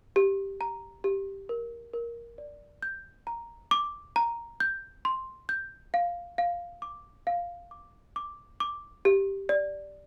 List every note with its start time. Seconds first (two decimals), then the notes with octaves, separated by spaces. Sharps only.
0.16 G4
0.61 A#5
1.04 G4
1.49 A#4
1.94 A#4
2.38 D5
2.82 G6
3.27 A#5
3.71 D6
4.16 A#5
4.60 G6
5.05 C6
5.49 G6
5.94 F5
6.38 F5
6.82 D6
7.27 F5
7.71 D6
8.16 D6
8.60 D6
9.05 G4
9.49 D5